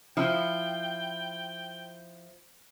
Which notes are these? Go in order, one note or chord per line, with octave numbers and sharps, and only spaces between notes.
F3 E4 G5